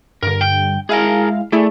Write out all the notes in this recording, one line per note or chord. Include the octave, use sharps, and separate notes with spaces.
G2 D3 A#4
G5
G#3 E4 G#4 A#4 F5
A3 E4 G#4 D5